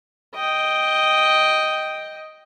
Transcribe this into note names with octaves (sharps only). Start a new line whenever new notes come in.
D#5 G5